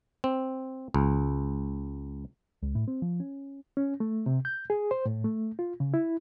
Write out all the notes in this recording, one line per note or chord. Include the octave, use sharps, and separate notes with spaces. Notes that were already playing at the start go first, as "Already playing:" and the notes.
C4
C#2
C#2
A2
C4
F3
C#4
C#4
A3
C3
G6
G#4
C5
A2
A3
F4
C#3
E4